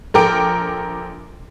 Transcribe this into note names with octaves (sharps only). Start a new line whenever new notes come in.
A#1 A4 A#4 G5 D6 D7